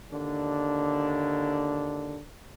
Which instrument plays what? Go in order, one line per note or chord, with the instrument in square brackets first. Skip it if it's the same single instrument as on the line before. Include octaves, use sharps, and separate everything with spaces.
[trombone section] D#2 D3 D4